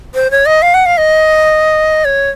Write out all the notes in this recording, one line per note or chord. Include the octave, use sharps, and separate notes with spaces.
C5
C#5
D#5
F5
F#5
F5
D#5
C#5